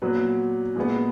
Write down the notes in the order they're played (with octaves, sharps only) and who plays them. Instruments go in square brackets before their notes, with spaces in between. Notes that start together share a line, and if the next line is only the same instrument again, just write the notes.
[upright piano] A#2 F#3 B3 B4
A#2 G#3 B3